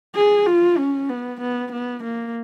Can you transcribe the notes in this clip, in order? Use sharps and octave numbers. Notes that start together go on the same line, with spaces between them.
G#4
F4
C#4
B3
B3
B3
A#3